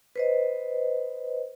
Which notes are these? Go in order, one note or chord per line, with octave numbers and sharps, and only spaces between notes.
B4 C5 D#5